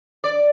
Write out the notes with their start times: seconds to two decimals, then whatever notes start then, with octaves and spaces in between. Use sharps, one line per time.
0.24 D5